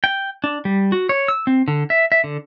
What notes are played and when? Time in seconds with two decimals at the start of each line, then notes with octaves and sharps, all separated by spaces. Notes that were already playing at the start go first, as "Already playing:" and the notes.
0.04 G5
0.44 D4
0.65 G3
0.92 F#4
1.09 C#5
1.28 E6
1.47 C4
1.68 D3
1.90 E5
2.12 E5
2.24 D3